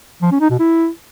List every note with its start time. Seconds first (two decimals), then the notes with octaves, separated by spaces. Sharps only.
0.22 F3
0.32 C#4
0.41 D#4
0.50 B2
0.59 E4